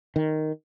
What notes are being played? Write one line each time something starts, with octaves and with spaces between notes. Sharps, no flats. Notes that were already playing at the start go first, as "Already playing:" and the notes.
D#3